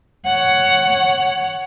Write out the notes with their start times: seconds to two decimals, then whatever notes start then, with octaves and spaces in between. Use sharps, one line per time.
0.25 C#5 F#5